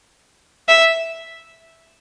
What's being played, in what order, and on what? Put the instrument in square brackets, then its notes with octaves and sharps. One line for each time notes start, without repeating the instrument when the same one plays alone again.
[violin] E5